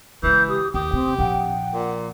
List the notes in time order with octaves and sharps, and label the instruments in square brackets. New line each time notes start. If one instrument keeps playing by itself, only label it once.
[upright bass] C#3 G#3 [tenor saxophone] E3 [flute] G6
[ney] G4 [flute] D#6
[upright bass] D#2 [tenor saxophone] G4 [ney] G5 [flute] D#6
[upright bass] C3 [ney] C4
[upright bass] A#1 F3 [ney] F#5 [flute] G5
[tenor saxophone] A#2